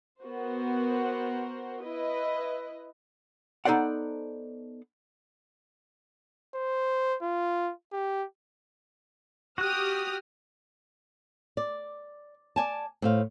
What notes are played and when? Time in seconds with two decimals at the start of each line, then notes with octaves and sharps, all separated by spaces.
0.21 B3 F#4 A#4 C5
1.83 E4 B4 D#5
3.65 B3 D#4 A4 C5 D5 F#5
6.55 C5
7.22 F4
7.92 G4
9.58 F#4 G4 D#6 F6 F#6
11.57 D5
12.56 D5 G#5 A5
13.02 A2 C5 F5